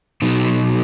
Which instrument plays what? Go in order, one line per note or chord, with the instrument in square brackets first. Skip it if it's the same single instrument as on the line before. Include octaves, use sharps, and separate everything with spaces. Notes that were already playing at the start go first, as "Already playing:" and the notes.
[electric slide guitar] B2 F#3 B3 D#4